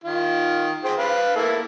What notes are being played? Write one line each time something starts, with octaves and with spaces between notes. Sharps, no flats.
D#3 F4
G#4 C5 G5
B4 F5
A#3 E4 A4